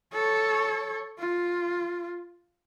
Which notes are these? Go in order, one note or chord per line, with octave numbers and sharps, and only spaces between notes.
A4 C#5
F4